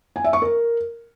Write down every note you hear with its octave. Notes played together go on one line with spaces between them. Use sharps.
G#5
E5
C#6
A#4